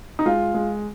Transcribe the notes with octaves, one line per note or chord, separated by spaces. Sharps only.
D#4
G#3 F4
G#3